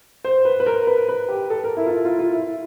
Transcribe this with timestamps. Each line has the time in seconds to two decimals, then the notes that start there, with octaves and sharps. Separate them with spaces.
0.25 C5
0.45 B4
0.60 B4
0.66 A#4
0.87 B4
1.09 B4
1.28 G4
1.50 A4
1.64 A#4
1.77 E4
1.86 F4
1.91 E4
2.05 F4
2.19 F4
2.33 E4